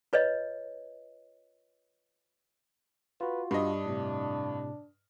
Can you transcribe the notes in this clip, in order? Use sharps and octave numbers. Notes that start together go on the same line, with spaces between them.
F4 B4 C#5 D#5
F4 F#4 B4
G2 D4 D#5
A2 C3